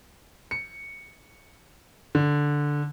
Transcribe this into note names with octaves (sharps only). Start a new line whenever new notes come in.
C#7
D3